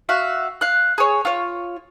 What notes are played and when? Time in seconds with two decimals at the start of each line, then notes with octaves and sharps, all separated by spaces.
0.09 F#4 E5 F5
0.61 F5 F#6
0.98 G#4 C#5
1.25 F4 C#5